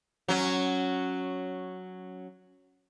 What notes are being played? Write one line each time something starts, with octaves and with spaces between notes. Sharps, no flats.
F#3 C#4